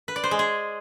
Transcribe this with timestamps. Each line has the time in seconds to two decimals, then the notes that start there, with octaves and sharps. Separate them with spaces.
0.08 B4
0.16 D5
0.24 C5
0.31 G#3
0.39 G#4